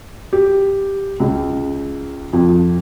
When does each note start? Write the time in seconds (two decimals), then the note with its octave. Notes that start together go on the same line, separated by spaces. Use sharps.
0.33 G4
1.20 C#2
2.33 F2